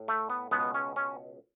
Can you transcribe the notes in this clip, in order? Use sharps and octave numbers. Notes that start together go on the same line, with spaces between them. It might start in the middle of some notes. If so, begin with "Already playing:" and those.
Already playing: A2
A3
B3
C#2 B2 G#3 B3
C#4
C#4